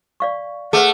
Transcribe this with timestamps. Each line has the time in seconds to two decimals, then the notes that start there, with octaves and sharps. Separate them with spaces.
0.20 D5 F5 C#6
0.73 A3 G#4 B4 F#5